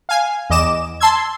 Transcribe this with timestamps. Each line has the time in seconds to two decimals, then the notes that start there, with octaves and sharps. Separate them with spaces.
0.09 F5 G#5
0.50 E2 D#5 D6 E7
1.00 A5 C6 E6 G#6